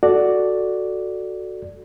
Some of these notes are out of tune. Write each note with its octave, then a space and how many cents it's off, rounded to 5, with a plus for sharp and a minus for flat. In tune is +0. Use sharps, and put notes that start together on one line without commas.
F#4 +0 A4 -5 D5 +0